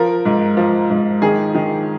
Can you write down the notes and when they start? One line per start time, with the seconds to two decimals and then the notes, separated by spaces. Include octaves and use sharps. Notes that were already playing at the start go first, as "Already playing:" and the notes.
Already playing: F3 A#4
0.25 G#2
0.57 F3
0.90 G#2
1.22 D#3 G#4
1.55 D#3